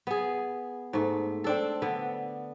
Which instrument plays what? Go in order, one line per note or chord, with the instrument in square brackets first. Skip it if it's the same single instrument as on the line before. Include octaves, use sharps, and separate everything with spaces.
[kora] B3 G#4
G#2 A3
C4 D4 A4
D3 B3